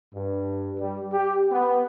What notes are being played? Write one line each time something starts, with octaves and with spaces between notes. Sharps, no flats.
G2
G3
G4
B3